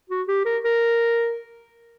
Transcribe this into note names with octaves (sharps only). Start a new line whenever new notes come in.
F#4
G4
A#4
A#4